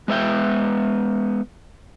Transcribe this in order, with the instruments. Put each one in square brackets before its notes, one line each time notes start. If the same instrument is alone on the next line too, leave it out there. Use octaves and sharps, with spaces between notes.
[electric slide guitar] G#3 B3 E5 G5